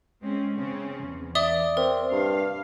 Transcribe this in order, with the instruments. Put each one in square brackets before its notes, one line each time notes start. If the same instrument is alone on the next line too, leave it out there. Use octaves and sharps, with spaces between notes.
[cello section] G#3 C4 C#4
C#3 C4 C#4
E2
[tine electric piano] D5 [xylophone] E5 D#6 G7
[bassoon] C4 [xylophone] A#4
[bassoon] G2 [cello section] F5